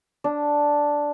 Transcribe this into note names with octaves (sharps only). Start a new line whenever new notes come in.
D4